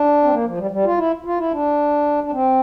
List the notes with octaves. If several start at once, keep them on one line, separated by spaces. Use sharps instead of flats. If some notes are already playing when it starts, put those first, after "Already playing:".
Already playing: D4
C4
A#3
F3
G3
G3
F4
E4
F4
E4
D4
D4
C4